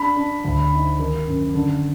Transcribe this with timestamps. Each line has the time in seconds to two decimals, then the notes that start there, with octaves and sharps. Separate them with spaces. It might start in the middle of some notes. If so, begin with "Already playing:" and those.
Already playing: D4 B5
0.16 D4
0.44 D2
0.72 D#4
0.99 D#3
1.27 F#2
1.54 D3